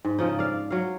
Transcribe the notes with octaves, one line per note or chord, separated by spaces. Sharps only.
G#2
C#3 F3 D#4
D5 F5
F#3 F5